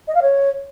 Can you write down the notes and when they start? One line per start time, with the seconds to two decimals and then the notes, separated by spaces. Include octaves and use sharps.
0.08 D#5
0.15 F5
0.22 C#5